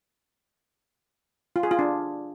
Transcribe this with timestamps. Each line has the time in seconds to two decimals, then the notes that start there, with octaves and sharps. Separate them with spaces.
1.56 F4
1.63 G#4
1.71 F4
1.79 D4